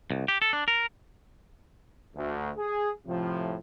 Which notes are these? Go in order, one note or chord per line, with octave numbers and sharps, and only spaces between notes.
C2
G4
A4
D4
A#4
D2
G#4
A2 C3 F3